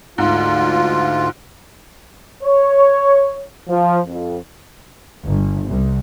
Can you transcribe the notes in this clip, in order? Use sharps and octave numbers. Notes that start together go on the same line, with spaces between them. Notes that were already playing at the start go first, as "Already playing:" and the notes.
D2 G#2 F4
C#5
F3
F2
G1
C2